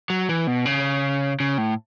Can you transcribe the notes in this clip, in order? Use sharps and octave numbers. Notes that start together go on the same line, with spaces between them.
F#3
E3
B2
C#3
C#3
A2